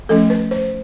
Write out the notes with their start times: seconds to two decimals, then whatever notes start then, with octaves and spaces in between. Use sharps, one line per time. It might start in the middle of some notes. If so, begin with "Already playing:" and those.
0.09 F3 A3 C#4 A4
0.30 B4
0.51 C5